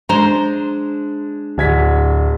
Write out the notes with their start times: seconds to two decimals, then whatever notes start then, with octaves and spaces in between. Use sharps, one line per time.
0.09 G#3 D4 C5 A#5
1.58 D1 D2 G#6 B6